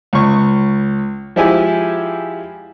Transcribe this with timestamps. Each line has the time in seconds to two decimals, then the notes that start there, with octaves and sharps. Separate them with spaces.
0.13 C#2 C#6
1.36 F3 G#3 E4 G4 G#5